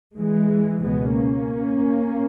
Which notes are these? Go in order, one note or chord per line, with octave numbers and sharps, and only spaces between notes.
E3 G#3
C#2 B2 G#3 B3
A#3 C#4